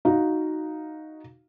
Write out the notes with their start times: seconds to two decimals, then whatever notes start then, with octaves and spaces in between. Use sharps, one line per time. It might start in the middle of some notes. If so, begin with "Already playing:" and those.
0.05 D#4 F#4 F5